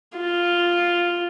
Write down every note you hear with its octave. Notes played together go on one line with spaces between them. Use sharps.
F4